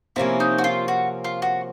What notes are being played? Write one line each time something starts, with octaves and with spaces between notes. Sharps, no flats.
C3 F3 A#3 C#4 E4
D#4
F#4
F4
F#4
F4
F#4